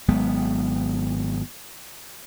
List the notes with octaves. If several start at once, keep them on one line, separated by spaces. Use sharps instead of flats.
G#1 F#3 G#3 B3